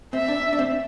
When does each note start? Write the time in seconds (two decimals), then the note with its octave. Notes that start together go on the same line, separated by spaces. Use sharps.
0.13 C4 E5
0.28 D4
0.53 D4
0.59 C4